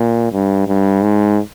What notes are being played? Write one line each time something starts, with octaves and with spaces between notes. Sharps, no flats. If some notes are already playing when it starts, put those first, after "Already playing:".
Already playing: A#2
G2
G2
G#2